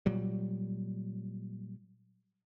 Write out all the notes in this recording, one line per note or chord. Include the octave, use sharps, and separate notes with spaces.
A#2 F#3 G3